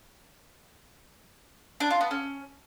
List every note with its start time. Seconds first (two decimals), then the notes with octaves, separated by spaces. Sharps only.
1.80 D4
1.91 F4
2.01 B3
2.11 C#4